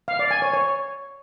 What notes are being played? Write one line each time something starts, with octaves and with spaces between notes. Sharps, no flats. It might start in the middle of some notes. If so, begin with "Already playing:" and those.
F5
D5
G#5
C#5
C#5